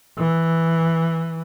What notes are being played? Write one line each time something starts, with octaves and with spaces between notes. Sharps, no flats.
E3